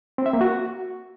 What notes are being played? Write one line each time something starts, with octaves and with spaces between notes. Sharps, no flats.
C4
E5
A#3
F#4